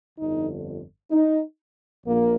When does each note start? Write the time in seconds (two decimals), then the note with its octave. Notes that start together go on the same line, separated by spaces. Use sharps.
0.17 G1 F2 D3 D#4
1.11 D#4
2.05 A#1 A#2 A#3